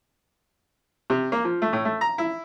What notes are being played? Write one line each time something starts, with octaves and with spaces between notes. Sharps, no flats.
C3
A#3
F3
A3
A2
A3
A#5
E4